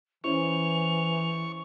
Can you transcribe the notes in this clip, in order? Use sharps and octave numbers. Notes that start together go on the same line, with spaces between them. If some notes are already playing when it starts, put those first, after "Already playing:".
E3 C#4 E4 C5 C#6 F7